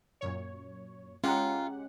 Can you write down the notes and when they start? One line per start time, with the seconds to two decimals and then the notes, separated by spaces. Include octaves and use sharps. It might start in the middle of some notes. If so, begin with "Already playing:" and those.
0.21 F#2 A#2 C#5
1.24 G#3 C#4 F4 G4 F#5 G5 A#5